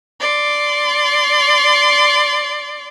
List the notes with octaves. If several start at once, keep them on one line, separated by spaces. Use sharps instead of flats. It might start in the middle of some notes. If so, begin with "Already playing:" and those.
D5 C6